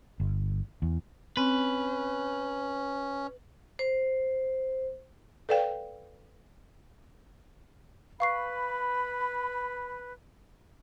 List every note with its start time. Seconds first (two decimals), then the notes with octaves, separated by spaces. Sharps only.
0.20 G1
0.82 E2
1.37 C4 C#4 B4
3.79 C5
5.49 A4 B4 D5 F5 G5
8.20 B4 F5 B5 C#6 C7